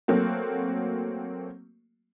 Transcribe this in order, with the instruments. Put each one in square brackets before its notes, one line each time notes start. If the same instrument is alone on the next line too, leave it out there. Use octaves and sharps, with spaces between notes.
[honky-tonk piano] F#3 A3 A#3 C4 F#4